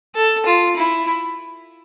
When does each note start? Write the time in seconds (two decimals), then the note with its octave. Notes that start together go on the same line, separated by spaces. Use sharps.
0.15 A4
0.46 F4
0.76 E4